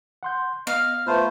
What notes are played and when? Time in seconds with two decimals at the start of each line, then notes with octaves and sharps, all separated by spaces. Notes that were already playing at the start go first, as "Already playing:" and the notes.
0.23 F#5 C6 G6
0.67 B3 D#5 F5
1.07 A3 B3 F4 B4 C5 A5 B5